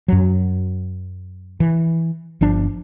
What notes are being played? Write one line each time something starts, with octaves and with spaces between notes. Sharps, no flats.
F#2 F#3
E3
G1 F3 D4